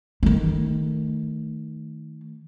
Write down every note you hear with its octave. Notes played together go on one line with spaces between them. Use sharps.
D#3 A3